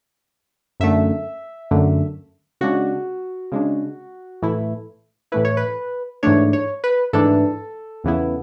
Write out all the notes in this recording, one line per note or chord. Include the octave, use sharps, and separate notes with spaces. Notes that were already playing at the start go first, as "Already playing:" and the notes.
F#2 D3 A3 E5
F#2 D3 A3
C#3 G#3 D4 F#4
C#3 G#3 D4
A2 E3 A3 E4
A2 E3 A3 E4 B4
C#5
B4
G#2 E3 A3 D4 C#5
C#5
B4
G#2 E3 A3 D4 A4
E2 C#3 E3 B3 E4